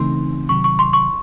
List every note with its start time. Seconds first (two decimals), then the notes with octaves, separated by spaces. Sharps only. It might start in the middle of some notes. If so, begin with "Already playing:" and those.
Already playing: C#3 E3 A3 C4 D#4 C6
0.49 C3 D#3 F#3 C#6
0.64 C#6
0.79 C6
0.93 C#6